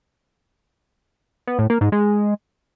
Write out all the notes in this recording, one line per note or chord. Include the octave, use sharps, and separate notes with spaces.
B3
A2
A#3
G#2
G#3